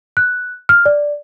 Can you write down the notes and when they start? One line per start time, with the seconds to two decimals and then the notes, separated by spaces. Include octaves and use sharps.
0.17 F#6
0.69 F6
0.86 D5